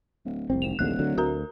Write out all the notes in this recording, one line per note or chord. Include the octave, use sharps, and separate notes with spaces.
D1
F1 C2 C4
G#1 E7 F7
D1 A#1 D#2 D3 F#6
D3 F#3
D2 F#4 A#4 A#5